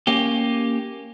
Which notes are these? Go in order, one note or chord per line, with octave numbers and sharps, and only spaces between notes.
A#3 C#4 G4